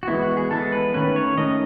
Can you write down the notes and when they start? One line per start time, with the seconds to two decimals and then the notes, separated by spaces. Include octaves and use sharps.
0.03 F#4
0.07 E3 G#3 B3 E4
0.23 F#4
0.37 G#4
0.51 E3 G#3 B3 A4
0.72 B4
0.94 D#3 A3 C#4 B4
1.16 C#5
1.37 D#3 A3 C#4 D#5